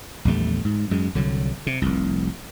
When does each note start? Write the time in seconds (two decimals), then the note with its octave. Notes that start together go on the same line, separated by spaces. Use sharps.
0.25 A#1 E2 G3 A3
0.65 G#2
0.91 F#2 G#3
1.15 C2 D3 F#3
1.67 C3
1.82 F1 C2